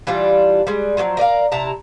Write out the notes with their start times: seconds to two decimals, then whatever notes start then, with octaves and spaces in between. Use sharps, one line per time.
0.07 E3 G3 D4 F4
0.67 G3 G#3
0.97 F3 F#3 A#3 C4
1.17 A#4 D5 D#5 F5
1.52 C3 E4 A5 A#5